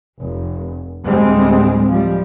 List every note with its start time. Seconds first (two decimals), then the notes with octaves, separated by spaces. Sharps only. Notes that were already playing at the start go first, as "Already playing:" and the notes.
0.19 F1
1.05 D2 A2 G3 G#3 C4
1.88 F3 G3